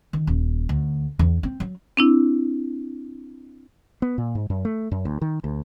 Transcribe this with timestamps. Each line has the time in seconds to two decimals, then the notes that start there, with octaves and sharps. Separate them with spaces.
0.13 D#3
0.27 D#1
0.69 D2
1.19 E2
1.43 C4
1.60 F#3
1.97 C4 D4 E4
4.02 B3
4.18 A#2
4.35 G#2
4.50 F#2
4.65 A3
4.92 F#2
5.05 D2
5.22 D#3
5.44 D2